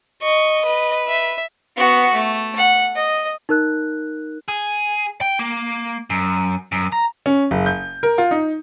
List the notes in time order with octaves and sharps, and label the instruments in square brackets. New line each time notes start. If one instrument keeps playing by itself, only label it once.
[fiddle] D#5 [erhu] C#6
[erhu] B4
[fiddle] E5
[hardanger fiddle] B3 F#4
A3
F#5
D#5
[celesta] D#4 A#4 F#6
[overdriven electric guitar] G#4
G5
A#3
F#2
F#2
A#5
[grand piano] C#4
F#1
G6
A#4
F4
D#4